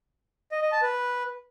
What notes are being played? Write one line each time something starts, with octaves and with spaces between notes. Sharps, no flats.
D#5
D#5
A5
B4